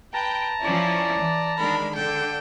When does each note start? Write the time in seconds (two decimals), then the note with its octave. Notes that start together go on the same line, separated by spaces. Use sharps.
0.14 B4 G5 A5 A#5
0.61 F3 C#4 E4 D5
1.17 E3
1.58 D#3 G#3 D4 A#4 B5
1.95 D3 A4 G5